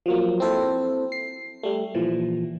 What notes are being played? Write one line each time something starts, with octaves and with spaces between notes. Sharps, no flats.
F3 F#3 A#3
C4 E4 A4 C5
C7
G3 A3
A#2 E3 F3